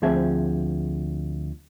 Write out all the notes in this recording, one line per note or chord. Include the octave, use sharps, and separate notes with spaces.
D2 F3 C4 G#4 E5 A5